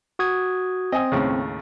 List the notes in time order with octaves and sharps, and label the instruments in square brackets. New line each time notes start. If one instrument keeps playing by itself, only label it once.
[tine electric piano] F#4 D#6 G#6
[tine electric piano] C4 [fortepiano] D#5 G#5 D#6
[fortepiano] D#2 A2 C#3